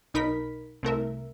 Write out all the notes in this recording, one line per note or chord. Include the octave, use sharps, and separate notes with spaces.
B1 D#4 A#4 B5 B6
C2 A3 A#4 E5